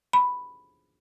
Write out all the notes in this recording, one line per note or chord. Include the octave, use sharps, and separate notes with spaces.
B5